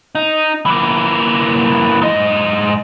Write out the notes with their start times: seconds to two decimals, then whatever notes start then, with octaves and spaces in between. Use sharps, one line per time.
0.15 D#4
0.66 E3 A#3
2.02 G#2 D#5